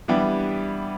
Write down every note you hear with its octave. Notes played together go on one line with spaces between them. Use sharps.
E3 G3 B3 D4 G4